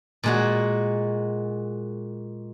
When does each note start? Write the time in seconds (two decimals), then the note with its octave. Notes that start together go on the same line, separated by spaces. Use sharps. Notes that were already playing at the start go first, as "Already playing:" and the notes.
0.24 A#2 G#3 F#4